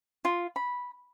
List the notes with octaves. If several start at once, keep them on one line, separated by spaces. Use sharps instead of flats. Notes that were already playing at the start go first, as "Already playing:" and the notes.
F4
B5